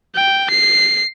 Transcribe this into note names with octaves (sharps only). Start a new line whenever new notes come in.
G5
C7